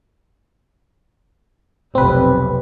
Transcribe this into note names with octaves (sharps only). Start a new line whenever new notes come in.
F1 B1 C4 B4